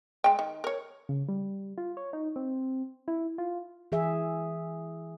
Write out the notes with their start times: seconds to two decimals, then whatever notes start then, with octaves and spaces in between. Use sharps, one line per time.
0.24 G#3 G5
0.39 D#3
0.64 A#4 C#5
1.09 C#3
1.28 G3
1.78 F4
1.97 C#5
2.13 D#4
2.36 C4
3.08 E4
3.38 F4
3.92 E3 G#4 E5